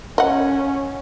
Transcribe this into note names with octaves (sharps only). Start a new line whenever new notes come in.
C#4 D#5 F#5